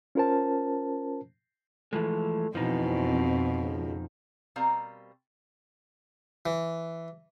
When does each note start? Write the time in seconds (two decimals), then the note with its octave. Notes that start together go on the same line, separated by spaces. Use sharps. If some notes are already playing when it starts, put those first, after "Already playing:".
0.15 C#4 F4 A#4 C5 A5
1.93 E3 F3 G#3 A3
2.55 F2 B2 E3 F3 D#4
3.62 C#2
4.56 B2 G3 C4 A#4 F5 A#5
6.46 E3